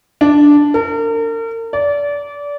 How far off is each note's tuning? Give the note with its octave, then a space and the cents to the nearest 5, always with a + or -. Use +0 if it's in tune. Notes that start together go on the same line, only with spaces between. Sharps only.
D4 -5
A#4 -40
D5 -25